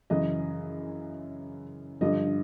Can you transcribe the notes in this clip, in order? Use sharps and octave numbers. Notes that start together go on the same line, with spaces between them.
F#2 C#3 E3 D#5
G2 D3 F3 D#5